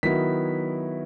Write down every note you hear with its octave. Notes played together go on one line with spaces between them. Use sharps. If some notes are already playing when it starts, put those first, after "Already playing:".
D#3 F#3 B3 E4 B6